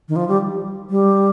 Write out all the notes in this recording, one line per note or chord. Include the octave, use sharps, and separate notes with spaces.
D#3
F3
G3
G3